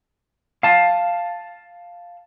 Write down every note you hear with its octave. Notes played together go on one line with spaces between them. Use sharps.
F5 A5